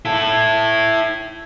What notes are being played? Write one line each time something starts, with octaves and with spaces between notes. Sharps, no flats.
E4 A4